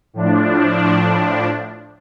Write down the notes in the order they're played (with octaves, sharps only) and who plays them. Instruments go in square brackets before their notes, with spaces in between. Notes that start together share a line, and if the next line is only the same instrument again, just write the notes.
[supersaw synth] A2 F3 D4